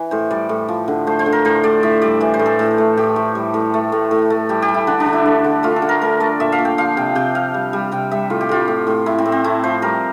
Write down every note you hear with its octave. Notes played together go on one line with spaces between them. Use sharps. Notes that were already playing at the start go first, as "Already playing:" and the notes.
Already playing: E3
A2 C5
G3 D5
A2
F3
D3
A3 C5
C5
D3
A#4
A2 C5
A2 D5
A2 E5
G3 D5
E3 E5
C5
A2
A4
A2
A3
A2 G4
A2
G3
A2
A3
A2
A2
A3
G3 G4
G4
G3
E4
D3 D4
D4
D3
E4
A3
D3
A3 F4
A4
D3
A#4
A3 A#4
A3 D5
A#2 E5
F5
A#2
G5
F3 F5
C3 G5
C3 G5
F3 F5
G3
G3
C3 G5
G3 E5
A2 F4
G4
A2 F4
A2
A2
A2 E4
C4
A2
C4
A3 E4
F3 C5
G3 A#4